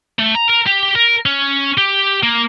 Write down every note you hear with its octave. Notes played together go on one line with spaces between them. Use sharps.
A3
A#5
A#4
G4
A#4
C#4
G4
A#3